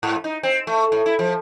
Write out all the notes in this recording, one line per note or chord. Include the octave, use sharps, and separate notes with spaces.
G#2
D#4
C4
A3
A2
E4
F3